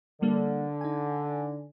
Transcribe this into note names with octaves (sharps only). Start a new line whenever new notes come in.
D3 G3 A#3 D4
D#4 G#5